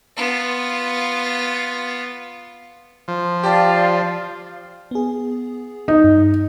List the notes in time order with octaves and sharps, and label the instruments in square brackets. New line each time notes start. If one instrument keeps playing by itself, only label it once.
[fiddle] B3 F4
[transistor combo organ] F3
[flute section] F4 D5 F5 [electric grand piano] G4 G5 A5
[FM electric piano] B3 G#4
[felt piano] D#4
[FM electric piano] G2